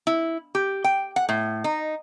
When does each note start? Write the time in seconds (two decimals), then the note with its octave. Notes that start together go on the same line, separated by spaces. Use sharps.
0.07 E4
0.55 G4
0.84 G5
1.16 F#5
1.29 A2
1.64 D#4